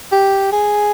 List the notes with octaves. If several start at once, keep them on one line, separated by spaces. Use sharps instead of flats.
G4
G#4